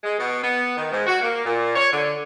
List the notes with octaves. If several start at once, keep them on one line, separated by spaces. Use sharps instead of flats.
G#3
B2
B3
D#3
G#2
F#4
A#3
A#2
C#5
D3